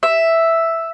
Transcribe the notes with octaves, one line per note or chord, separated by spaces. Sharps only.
E5